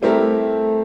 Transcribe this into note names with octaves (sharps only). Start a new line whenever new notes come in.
G3 A3 C4 E4 G4 A#4
A3